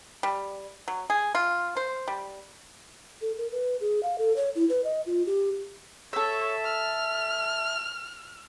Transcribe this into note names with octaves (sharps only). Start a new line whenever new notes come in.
G3
F#3
G#4
F4
C5
G3
A4
A#4
B4
G#4
F5
A4
C#5
E4
B4
D#5
F4
G4
A4 C#5 E5
F6